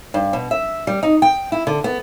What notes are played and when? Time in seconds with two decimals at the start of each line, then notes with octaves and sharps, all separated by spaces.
0.14 G2
0.33 B2
0.51 E5
0.87 G3
1.03 D#4
1.22 G5
1.52 E4
1.67 D3
1.84 B3